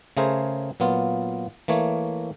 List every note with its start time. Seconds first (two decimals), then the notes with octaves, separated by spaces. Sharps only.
0.17 C#3 A3 G#4 A#4 C5
0.80 A#2 F#3 B3 F4
1.68 E3 A3 A#3 C#5